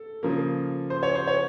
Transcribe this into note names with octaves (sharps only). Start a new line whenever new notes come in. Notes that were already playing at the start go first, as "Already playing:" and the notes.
Already playing: A4
C#3 F3 A#3
C5
C#5
C5
C#5